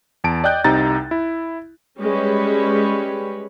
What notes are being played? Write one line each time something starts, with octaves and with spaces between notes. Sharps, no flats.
E2 A5 D7
D5 D#5 G5 F#6 G6
C2 C3 D#4 A#5 A6
E4
G3 G#3 C#4 B4 C#5